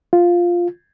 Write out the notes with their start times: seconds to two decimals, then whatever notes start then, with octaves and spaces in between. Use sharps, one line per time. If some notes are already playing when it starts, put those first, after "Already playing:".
0.13 F4